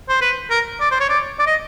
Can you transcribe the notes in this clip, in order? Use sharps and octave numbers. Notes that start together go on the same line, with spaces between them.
C5
B4
A#4
D5
C5
C#5
D5
D5
D#5